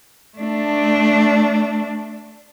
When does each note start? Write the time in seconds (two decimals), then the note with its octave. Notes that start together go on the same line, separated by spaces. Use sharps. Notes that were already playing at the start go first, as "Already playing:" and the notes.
0.38 A3 D4